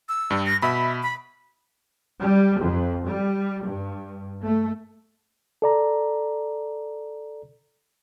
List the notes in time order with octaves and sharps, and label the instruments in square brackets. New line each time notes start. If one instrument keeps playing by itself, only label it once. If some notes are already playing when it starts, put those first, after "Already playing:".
[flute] E6
[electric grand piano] G2 G3
[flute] A#6
[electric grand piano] B2 B5 [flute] E5
[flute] B5
[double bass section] G3
F2
G3
G2
A3
[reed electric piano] A4 D5 A#5